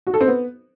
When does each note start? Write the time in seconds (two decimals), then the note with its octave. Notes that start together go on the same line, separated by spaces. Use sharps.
0.07 F#4
0.14 A4
0.21 C4
0.28 B3